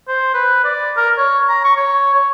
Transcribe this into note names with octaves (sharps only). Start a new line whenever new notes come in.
C5
B4
D5
A#4
C#5
A#5
C#6
C#5
C#5